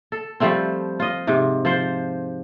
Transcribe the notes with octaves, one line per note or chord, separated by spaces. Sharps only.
A4
F3 G3 A3 C4
F4 D#5
G#2 C3
F3 C5